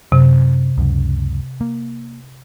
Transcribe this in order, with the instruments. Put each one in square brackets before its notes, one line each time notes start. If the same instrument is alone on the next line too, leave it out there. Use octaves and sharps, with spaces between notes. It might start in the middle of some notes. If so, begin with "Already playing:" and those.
[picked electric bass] F#2 [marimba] C3
[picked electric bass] C#2 F#2
A#3